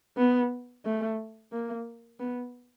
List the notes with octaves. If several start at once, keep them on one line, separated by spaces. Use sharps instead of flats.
B3
A3
A#3
B3